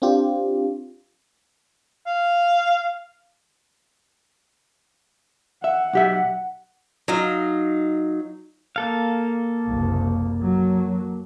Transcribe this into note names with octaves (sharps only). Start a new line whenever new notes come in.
C4 D4 F4 G4
F5
E5 F#5
B1 G4 E5
F#3 D#4 F5
A#3 A4 F5
F#1 C2
F#3